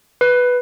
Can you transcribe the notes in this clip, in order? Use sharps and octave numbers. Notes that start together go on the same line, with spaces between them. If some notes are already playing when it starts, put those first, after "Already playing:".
B4